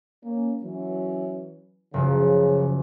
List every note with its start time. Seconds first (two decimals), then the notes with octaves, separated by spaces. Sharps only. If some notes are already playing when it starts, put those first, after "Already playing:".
0.24 A#3 C#4
0.63 E3 F#3 C#4
1.94 F#1 C#3 F3